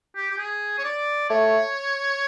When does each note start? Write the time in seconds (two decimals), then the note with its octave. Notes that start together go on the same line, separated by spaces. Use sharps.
0.16 G4
0.31 G4
0.38 G#4
0.78 C#5
0.84 D5
1.30 A3 C#5